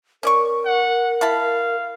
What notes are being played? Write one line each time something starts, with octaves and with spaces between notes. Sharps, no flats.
C#4 A#4 D5 C#6
F#5
E4 F5 A5 B5